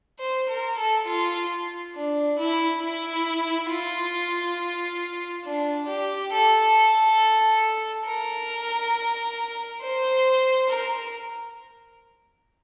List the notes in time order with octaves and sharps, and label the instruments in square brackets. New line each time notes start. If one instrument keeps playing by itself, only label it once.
[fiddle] C5
A#4
A4
F4
D4
E4
E4
F4
D4
G4
A4
A#4
C5
A#4